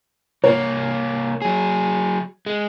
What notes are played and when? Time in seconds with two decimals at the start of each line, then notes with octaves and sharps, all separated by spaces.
0.44 C2 A#3 C#5
1.42 F#3 G#4
2.46 G#3